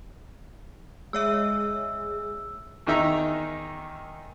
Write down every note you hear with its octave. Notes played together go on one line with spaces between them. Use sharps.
G#3 G#4 C#5 E5 E6
E2 D#3 D#4 E5 A#5